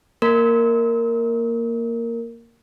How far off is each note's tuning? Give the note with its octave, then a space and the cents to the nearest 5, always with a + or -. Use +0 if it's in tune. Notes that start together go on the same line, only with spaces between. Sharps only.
A#3 -5 A#4 -10